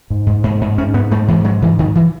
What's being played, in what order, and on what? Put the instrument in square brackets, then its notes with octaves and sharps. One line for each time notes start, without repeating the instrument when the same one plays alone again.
[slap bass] G#2
G#2
G#2
G#2
G#2 C#4
G#2 B3
G#2 A3
G#2 E3
G#2 F#3
G#2 E3
G#2 D#3
E3